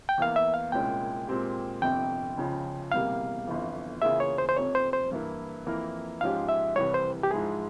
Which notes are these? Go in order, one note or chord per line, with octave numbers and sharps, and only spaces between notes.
G5
E2 E3 A#3 F5
E5
F5
C2 A#2 G#3 C#4 G5
A#2 G#3 C4 G4
G1 F2 C3 G5
C#2 C#3 F3
E1 E2 C3 G3 A#3 F5
G1 F2 E3
C#3 E3 A#3 F4 G#4 E5
C#5
C5
C5
F1 F2 C3 C#5
C5
C5
G2 E3 A#3 E4
F2 E3 A#3 E4 A#4
G#2 F3 G#3 C#4 G4 F5
E5
C2 C3 E3 G3 C#5
C5
G4
G#2 F3 G#3 E4 G#4